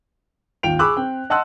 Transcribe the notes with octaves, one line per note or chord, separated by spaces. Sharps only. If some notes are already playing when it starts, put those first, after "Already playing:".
G#1 D#2 F4 G5 D7 F7
G#4 B5 C#6 D6 E6 F#6
C4 G5
D#5 F#5 A5 C6 E6 F#6